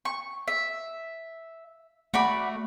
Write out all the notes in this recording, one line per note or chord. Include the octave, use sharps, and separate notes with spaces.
C#6
E5
A3 F#4 D5 B5